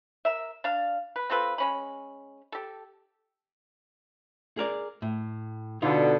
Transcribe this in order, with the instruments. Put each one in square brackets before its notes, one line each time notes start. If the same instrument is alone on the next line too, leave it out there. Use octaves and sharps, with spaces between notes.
[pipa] A#4 E5
D4 F5
B4
C4 F4 A4 B4
G#3 C#4 B5
G4 A4
[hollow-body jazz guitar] G#4 A#4 D5
A2
[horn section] B2 D3 [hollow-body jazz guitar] D#4 F4